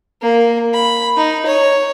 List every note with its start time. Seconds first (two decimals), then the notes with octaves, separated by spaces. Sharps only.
0.22 A#3
0.73 B5
1.17 D#4
1.46 C#5